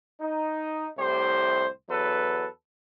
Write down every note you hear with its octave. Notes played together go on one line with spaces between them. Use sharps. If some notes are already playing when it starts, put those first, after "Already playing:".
D#4
C2 A2 G4 C5
E2 F#3 A4 B4